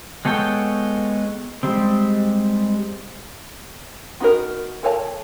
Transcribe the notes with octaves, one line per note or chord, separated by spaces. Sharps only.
G#3 B3 A4 C#5 G5
G3 G#3 C4
B3 D#4 F#4 A4 A#4
A4 A#4 C#5 G#5 A5